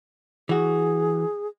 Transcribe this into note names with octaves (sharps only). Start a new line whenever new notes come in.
E3 F#4 G#4